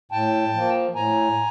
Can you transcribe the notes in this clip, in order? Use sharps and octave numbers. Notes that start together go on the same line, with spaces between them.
A2 G5 A5
F3 A#3
A2 G#5 A#5